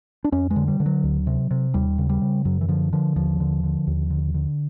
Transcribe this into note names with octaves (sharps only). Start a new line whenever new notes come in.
D4
F2 C#4
G#3
D3
G3
D3
F#3
D2
C3
C3
D#2 G3
C#3
G3
C#3
F#2 F#3
E3
D3 F3
D3 F3
D#2 F3
D3
D3
D#2
D3
D3